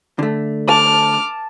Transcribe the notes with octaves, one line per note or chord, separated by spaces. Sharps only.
D3 A3
A5 D6 F6